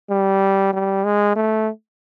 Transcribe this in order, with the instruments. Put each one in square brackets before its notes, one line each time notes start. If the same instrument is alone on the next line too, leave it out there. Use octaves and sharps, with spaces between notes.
[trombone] G3
G3
G#3
A3